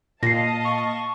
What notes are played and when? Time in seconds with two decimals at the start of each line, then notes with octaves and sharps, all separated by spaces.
0.23 A#2 D#5 F5 A5 A#6 C7
0.65 C#6